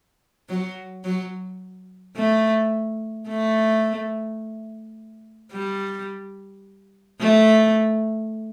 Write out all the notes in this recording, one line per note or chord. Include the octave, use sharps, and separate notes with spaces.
F#3
F#3
A3
A3
G3
A3